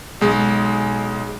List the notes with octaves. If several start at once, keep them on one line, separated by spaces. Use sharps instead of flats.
B1 G#3